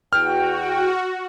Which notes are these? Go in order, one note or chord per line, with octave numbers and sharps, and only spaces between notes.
E2 F#4 G5 F6